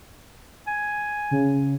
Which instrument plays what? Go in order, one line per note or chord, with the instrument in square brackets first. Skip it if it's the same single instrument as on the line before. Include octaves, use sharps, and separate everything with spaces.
[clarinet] G#5
[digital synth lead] C#3